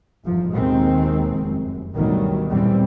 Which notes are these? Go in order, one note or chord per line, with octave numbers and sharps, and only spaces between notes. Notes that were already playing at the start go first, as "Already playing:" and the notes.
G1 E2 G#2 F3
D#2 B2 D#3 G#3 C4
F1 F#2
D2 G2 B2 D#3 F#3 G3
E2 A#2 E3 G3 C4